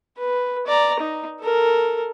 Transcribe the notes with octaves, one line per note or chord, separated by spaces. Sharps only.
B4
D5 A#5
D#4
A4 A#4